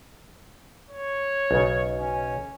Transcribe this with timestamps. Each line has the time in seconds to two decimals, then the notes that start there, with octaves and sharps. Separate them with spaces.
0.90 C#5
1.51 B1 C#3
1.99 C#4